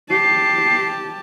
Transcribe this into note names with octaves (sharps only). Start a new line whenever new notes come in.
G4 A5 C7